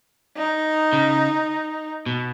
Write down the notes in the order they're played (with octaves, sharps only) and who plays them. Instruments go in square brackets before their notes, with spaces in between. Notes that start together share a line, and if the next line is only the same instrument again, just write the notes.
[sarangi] D#4
[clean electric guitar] C#3
B2